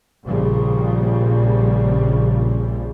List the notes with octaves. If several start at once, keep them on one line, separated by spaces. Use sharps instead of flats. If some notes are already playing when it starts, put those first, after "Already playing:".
A#1 A#2 C#3 F3 G3 A#3